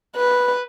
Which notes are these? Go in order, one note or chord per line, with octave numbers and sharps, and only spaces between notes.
B4